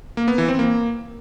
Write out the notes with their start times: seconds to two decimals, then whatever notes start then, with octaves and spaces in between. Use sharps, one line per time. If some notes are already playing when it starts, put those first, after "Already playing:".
0.17 A#3
0.28 B3
0.38 E3
0.48 C4
0.59 A#3